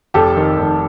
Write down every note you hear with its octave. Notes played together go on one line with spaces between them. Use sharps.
F1 G4 A4
D#3
F1